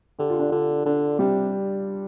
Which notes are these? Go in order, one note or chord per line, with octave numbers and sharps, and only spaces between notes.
D3 G4
F4
D4
D3 F4
D3 D4
C3 G3